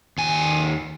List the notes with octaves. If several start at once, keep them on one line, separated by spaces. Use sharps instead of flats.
D#2 G#5